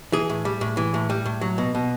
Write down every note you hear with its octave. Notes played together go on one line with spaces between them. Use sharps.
E3 G#4
A2
G3
A2
E3
A2
G3
A2
F#3
B2
B2